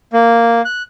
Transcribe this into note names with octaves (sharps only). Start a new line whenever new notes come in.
A#3
F#6